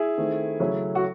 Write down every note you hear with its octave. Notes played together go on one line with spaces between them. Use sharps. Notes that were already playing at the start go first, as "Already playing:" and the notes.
Already playing: E4 G#4
D#3 A3 C4
C#3 F#3 A3 C#4 E4
F#4